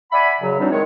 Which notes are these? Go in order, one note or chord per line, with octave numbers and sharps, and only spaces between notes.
D5 E5 F#5 G#5 B5
F#2 C#3 F#3
E3 F#3 G3 C4 D4 D#4
D#3 G#3 C#5